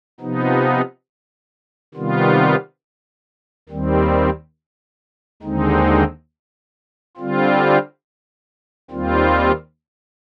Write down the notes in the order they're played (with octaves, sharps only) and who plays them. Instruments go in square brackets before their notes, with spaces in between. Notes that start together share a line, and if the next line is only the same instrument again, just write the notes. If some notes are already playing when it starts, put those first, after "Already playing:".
[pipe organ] C3 F3 B3 D#4
C3 D#3 G3 B3 F4
D#2 D#3 G3 C4
D#2 D3 G#3 C4 D#4
D3 G3 C4 F4
D#2 D#3 G3 C4 F4